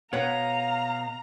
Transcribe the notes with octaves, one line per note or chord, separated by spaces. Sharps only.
B2 C#5 F5 F#5 A#5